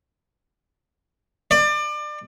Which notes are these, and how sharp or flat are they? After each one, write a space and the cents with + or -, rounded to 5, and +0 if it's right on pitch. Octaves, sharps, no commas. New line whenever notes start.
D5 +30